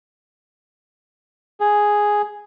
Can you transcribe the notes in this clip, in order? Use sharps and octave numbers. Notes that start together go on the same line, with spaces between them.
G#4